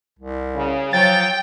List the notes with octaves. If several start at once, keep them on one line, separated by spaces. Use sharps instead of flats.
C2
C#3
F3 F#3 C#5 G5 A6